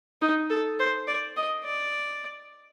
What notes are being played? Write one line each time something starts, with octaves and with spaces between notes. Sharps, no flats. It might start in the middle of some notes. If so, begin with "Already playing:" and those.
D#4
A4
C5
D5
D#5
D5